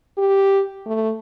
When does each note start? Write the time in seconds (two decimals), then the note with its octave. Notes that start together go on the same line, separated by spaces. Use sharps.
0.18 G4
0.86 A3